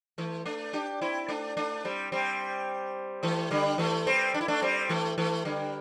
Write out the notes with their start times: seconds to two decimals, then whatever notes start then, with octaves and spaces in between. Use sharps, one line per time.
0.18 E3 A3
0.46 A3 D4
0.73 D4 G4
1.01 C4 E4
1.28 A3 D4
1.57 A3 D4
1.85 G3 C4
2.12 G3 C4
3.23 E3 A3
3.51 D3 G3
3.78 E3 A3
4.07 G3 C4
4.34 D4
4.41 E4
4.48 A3 D4
4.62 G3 C4
4.89 E3 A3
5.18 E3 A3
5.45 D3 G3